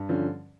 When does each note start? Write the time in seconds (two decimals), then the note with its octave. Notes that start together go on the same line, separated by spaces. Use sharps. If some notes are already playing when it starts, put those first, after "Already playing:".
Already playing: G2
0.09 D3 F3 C#4